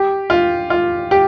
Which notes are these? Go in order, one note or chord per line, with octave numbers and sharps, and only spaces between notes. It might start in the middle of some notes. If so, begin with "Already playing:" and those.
Already playing: G4
F4
F4
G4